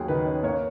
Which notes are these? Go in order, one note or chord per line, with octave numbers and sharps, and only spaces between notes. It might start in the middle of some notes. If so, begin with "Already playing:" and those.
Already playing: D#2 F#3 G#4
D#3 B4
C#4
A#3 C#5